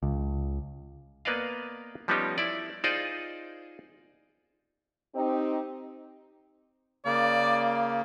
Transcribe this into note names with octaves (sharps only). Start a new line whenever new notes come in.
C#2
A#3 B3 B4 D5 D#5 F5
F3 G3 B3 C#4 D#4 G4
E4 D5
D#4 F4 G#4 C5 D5 D#5
C4 D#4 G4
C#3 A#3 D5